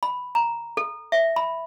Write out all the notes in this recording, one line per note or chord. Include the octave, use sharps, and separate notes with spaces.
B5
A#5
A4
E5
B5